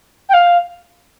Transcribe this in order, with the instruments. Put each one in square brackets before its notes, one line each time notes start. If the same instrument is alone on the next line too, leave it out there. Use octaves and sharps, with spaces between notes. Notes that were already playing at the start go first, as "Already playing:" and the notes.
[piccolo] G5
F5